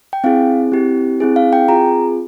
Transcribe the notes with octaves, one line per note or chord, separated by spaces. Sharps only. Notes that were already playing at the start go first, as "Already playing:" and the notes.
G5
C4 E4 G#4 F5
C4 E4 G4
C4 E4 G#4
F5
G5
C4 F4 G#4 A#5